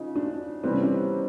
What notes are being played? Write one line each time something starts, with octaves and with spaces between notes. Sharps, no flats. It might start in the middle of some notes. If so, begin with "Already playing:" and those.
Already playing: C#3 F3 D#4
D4
C3 E3 G3 B3 C4
C#4
C4